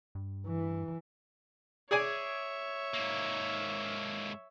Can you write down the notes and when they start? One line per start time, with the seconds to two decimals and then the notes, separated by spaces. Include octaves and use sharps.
0.15 G2
0.47 E3
1.91 G#4 C#5 D5 E5 G#5
2.94 G#2 A#3